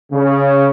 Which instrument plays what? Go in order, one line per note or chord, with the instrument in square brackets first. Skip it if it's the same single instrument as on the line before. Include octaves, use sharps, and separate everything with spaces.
[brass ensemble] C#3